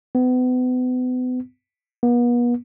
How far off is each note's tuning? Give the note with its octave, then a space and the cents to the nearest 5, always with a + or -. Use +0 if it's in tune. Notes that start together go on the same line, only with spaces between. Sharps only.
B3 +35
B3 -40